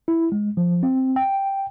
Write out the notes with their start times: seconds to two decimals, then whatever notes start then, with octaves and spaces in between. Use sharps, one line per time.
0.08 E4
0.32 G#3
0.57 F3
0.83 C4
1.16 G5